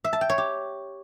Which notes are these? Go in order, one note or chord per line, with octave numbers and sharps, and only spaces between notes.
E5
A5
G5
C#5
G4